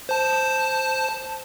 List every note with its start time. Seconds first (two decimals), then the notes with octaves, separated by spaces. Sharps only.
0.09 C5 A5